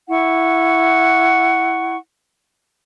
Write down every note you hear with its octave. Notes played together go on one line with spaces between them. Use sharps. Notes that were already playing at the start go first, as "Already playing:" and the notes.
E4 F#5 C#6